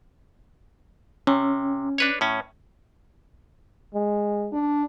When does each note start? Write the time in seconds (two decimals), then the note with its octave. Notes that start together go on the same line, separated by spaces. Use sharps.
1.27 C3 C#4
1.98 D4 B4 C#5
2.21 A2 C#4
3.94 G#3
4.53 D4